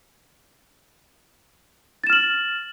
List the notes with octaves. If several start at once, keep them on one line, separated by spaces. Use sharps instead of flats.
F6 A6 E7 F#7